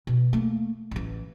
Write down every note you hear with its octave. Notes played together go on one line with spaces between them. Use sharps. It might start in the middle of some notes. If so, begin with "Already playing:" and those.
B2
A3 A#3
A1 E3